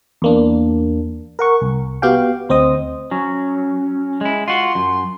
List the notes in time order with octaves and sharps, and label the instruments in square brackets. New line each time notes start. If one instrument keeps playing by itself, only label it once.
[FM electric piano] E2 A#3 D4
A#4 F#5 C#6
C2
B3 F#4 G4 F5 G5
D2 C4 C5 D#5 D#6
[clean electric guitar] F#3 [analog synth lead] C#4
[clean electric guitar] G#3 E4
[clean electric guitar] F4 F#4 [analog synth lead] C6
[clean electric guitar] F#2